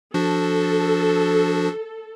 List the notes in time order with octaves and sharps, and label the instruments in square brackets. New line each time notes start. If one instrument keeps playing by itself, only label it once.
[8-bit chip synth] F3 D4 F#4 [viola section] A4